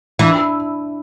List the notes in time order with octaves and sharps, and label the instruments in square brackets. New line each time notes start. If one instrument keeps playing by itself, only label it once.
[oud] E3 [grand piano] D4